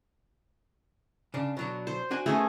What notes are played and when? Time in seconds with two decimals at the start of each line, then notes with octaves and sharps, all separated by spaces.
1.34 C#3 D4
1.57 B2 F#3 D4
1.87 C5
2.11 D4 F#4 G#5
2.26 A3 B3 C#4 D#4 G#4